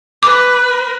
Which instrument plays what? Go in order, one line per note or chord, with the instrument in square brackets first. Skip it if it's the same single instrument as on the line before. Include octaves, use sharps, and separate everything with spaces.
[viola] B4 [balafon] D6